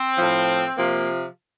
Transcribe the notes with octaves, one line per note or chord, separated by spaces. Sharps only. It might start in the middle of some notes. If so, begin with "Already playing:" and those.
Already playing: C4
A2 F3
C3 F3 A#3